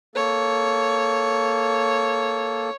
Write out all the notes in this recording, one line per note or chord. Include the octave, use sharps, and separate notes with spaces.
A#3 A4 C#5